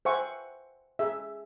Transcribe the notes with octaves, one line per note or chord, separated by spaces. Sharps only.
C5 E5 F#5 G#5 C#6
G#4 E5